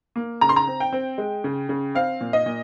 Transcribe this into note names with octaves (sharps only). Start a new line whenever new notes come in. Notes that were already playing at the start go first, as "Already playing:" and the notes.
A#3
C#3 A#5
C6
A#5
C4
G5
C4
G#3
C#3
C#3
C4 F5
A#2
D#5
A#2